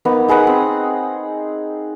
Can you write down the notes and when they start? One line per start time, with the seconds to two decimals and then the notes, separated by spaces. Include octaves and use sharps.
0.05 A#3 B3 D#4 F#5
0.28 D#4 G#4 B4 F#5
0.47 C4